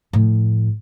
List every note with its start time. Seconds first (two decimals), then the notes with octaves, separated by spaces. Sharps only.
0.13 A2 F3